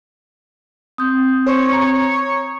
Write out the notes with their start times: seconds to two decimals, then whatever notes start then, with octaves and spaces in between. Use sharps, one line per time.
0.98 C4 D#6 G6
1.46 C5 C#5
1.73 A#5